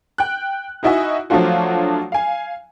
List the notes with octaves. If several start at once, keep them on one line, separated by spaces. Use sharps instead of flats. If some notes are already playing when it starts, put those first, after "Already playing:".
G5 F#6
D#4 E4 F#4 D#5 E5 G#5
F3 F#3 A3 D4 F4 F#4
F5 G#5